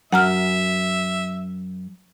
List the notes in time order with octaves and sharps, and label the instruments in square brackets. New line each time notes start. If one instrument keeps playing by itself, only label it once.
[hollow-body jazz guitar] F#2 [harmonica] E5 [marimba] F#5 A#5 F6